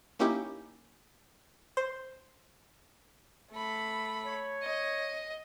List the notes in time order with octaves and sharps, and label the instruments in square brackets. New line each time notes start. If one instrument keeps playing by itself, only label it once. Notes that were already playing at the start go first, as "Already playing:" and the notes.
[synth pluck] A#3 C#4 D#4 E4 G4
C5
[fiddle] A3 B5
[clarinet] C#5
[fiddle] D#5